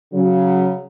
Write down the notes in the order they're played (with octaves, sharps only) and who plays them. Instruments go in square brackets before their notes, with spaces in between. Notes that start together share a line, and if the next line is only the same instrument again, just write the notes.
[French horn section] C#3 F#3